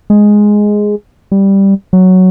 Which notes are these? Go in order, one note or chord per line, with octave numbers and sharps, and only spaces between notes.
G#3
G3
F#3